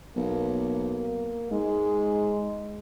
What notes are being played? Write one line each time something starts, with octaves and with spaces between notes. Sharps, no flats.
B1 A#3
G#2 G#3